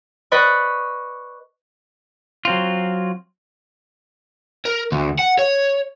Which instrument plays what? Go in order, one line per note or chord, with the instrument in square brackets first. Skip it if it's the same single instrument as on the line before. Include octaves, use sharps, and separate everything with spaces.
[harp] B4 D5 D#5 B5 C#6
[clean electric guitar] F#3 C4 F4
[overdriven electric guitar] A#4
D2
F#5
C#5